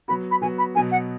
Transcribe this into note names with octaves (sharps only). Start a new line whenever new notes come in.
F#3 B3 F#4 B5
B5
F#3 B3 F#4 G#5
B5
B2 F#3 B3 F#4 G#5
F#5